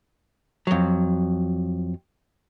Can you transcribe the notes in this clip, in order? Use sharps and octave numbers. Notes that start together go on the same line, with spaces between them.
F2 F#3